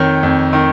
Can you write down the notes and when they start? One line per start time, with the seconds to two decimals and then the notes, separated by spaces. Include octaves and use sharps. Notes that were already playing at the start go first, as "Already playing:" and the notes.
Already playing: F2 D#3 C#5
0.23 F2
0.53 D#3